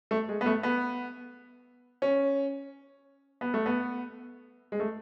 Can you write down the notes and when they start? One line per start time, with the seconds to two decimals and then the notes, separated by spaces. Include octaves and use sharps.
0.11 A3
0.29 G#3
0.41 B3
0.46 A3
0.63 B3
2.02 C#4
3.41 B3
3.54 A3
3.66 B3
4.72 G#3
4.80 A3